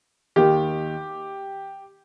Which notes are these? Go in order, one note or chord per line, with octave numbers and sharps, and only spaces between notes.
D#2 D#3 G4